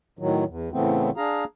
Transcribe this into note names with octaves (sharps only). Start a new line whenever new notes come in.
A2 D#3 F#3
E2
A2 C#3 E3 A3 B3 C4
D4 G#4 F5 A#5